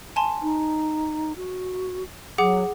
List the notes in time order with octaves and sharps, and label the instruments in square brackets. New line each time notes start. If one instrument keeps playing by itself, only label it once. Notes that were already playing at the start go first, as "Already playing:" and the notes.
[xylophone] G#5 A5 C6
[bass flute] D#4
F#4
[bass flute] F#3 [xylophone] G#4 F#5 D6